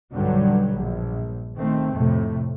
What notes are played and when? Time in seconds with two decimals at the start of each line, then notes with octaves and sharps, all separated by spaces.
0.13 B1 G2 B2 D3 F#3 G3
0.74 A#1
1.57 D#3 A3 C4
1.93 F2 A2 C3 A3